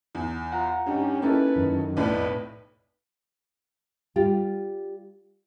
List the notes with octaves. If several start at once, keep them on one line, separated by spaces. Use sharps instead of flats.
E2
F4 F#5 A#5
G2 C#4 D#4 G4
A#3 C#4 D#4 E4 A4 B4
F#2 D#3
B1 F2 A2 B4 D5
G3 F4 G4